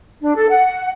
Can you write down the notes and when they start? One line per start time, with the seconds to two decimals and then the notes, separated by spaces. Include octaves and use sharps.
0.21 D4
0.35 A4
0.49 F#5